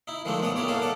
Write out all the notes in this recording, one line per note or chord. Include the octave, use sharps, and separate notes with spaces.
D#4 E4
D#3 F3 G#3 A3 D4 D#4
B1 B3 D5 F#5 D#6
G3 D#4 E4 C#5 D5
A#3 C#4 G#4 A4 F#5 A5
A4 D5 F#5 D6